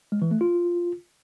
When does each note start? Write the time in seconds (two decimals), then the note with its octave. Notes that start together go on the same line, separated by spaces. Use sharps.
0.12 G#3
0.22 E3
0.31 A3
0.41 F4